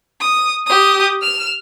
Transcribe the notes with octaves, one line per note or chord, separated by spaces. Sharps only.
D#6
G4 D#6
F6 E7